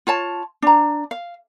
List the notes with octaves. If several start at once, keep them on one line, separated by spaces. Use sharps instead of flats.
F4 C#5 A5
D4 A#5
F5